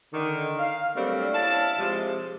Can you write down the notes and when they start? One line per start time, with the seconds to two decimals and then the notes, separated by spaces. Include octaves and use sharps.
0.13 D3 D#3
0.58 F5
0.95 F#3 G3 A3 A#3 C4 D4
1.33 C#4 D4 E4 F5 A5
1.78 C3 F3 G#3